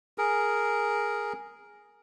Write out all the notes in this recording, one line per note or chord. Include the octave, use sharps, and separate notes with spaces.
G#4 A#4